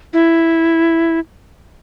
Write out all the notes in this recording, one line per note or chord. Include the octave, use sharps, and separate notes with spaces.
E4